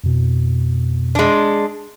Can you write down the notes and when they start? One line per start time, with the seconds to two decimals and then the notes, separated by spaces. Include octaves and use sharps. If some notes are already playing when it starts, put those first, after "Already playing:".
0.04 F2 B2
1.15 G#3 D4